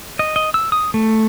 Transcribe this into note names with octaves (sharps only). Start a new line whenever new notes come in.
D#5
D#5
E6
D#6
A3